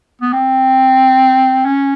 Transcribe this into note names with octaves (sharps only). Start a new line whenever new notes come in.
B3
C4
C#4